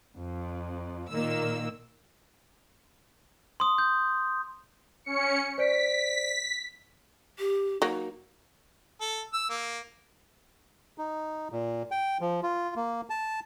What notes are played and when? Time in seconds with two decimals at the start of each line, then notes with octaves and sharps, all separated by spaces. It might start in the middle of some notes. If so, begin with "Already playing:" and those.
0.16 F2
1.11 A#2 D#3 A#3 E6
3.60 C6 D#6
3.78 G6
5.04 C#4 C#7
5.58 C5 D5 B6 D7
7.39 G4
7.82 F#3 A#3 D#4
9.01 A4
9.33 E6
9.50 A#3
10.98 D#4
11.52 A#2
11.91 G5
12.21 F3
12.43 F4
12.76 A#3
13.10 A5